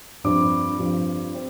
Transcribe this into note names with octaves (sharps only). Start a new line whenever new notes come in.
G2 F3 C4 D6
G2 F3 C4
C4